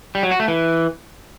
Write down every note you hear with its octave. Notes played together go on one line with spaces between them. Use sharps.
G3
F#3
F#4
A3
E3